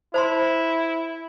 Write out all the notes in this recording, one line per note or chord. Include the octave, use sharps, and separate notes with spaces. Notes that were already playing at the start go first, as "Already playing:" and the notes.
E4 C5 A5 C6